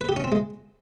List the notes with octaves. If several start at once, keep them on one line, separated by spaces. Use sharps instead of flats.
B4
G4
C#4
C4
G#3